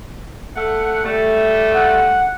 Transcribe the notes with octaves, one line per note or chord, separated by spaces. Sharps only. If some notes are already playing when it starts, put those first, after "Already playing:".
A3 A4 F#5
G3 A3
F#5